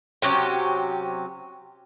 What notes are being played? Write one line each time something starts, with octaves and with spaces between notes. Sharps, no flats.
C3 F#3 C#4 G4